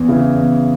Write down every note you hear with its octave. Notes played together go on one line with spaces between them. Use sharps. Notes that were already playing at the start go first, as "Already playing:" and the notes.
Already playing: E2
C#3 E3
E2